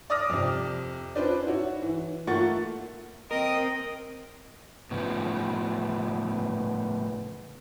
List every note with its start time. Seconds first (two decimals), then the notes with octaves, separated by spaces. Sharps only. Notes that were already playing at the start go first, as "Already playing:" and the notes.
0.10 D5 D6 D#6 F6 A#6
0.30 F2 C3
1.15 C#4 D4 F4 B4 C5 D5
1.47 E4 F#4 C#5
1.82 E3
2.27 A3 A#3 F4 F#5 C#6 A6
3.31 C4 A#4 D#5 G5 D#6
4.91 A2 C#3 F3 B3